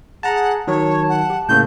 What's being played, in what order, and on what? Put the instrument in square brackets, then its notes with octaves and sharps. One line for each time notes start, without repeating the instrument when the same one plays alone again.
[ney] G#4 [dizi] F#5 [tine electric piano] A5 A#5
[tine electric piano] D#3 F#3 [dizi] C#5 [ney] A5
[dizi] F#5
[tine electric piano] G4
[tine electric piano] A2 C#3 A#3 [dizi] G6